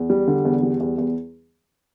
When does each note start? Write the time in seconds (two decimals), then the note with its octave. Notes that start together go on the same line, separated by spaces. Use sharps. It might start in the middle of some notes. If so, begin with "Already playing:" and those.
Already playing: E2
0.10 G3
0.28 D3
0.45 E2
0.63 G3
0.80 E2
0.98 E2